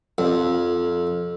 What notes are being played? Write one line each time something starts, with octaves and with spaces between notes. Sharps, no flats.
F2